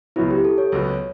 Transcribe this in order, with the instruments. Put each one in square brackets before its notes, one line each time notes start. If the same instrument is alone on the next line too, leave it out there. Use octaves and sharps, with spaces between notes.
[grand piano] C#2 B2 F#3 B3 F#4 [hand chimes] E4
[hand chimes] G4
A4
C#5
[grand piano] C#2 B2 F#3 B3 F#4